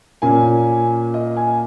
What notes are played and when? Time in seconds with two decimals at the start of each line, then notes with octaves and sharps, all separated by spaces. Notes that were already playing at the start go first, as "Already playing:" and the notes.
0.22 A#2 A#3 C#4 G#5
1.14 D#5
1.37 G#5